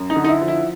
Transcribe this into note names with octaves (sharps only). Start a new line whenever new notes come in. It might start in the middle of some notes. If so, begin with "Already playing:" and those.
Already playing: F#2
D#4
D3
D#4
E4
F3
E4